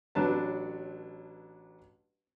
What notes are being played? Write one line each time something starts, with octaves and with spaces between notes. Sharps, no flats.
A1 F#3 D4 B4 A5